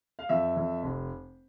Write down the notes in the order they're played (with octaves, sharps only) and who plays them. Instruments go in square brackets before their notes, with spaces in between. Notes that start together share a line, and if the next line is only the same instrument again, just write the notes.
[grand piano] F5
F2 E5
F2
F1